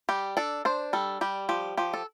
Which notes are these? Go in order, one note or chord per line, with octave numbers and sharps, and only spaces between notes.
G3 G4
D4 A4
D4 C5
G3 A4
G3 G4
F3 G4
F3 G4
A4